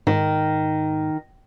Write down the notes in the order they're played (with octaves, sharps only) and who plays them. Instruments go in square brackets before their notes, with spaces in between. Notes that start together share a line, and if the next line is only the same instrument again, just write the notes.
[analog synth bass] G#2 [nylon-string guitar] D#3